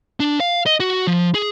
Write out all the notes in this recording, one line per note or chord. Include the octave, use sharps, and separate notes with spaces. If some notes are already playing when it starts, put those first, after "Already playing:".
D4
F5
D#5
F#4
F3
G#4